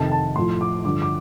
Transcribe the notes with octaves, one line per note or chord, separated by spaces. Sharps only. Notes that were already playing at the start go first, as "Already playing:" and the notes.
Already playing: F2 C3 D#3 A5
A5
A2 F3 C6
D6
G2 D3 F3 D6
D6